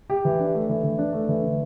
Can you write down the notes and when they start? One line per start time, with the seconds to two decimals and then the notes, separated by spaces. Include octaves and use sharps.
0.10 G4
0.25 E3
0.40 D4
0.54 A3
0.69 E3
0.84 E3
0.98 D4
1.13 A3
1.29 E3
1.44 D3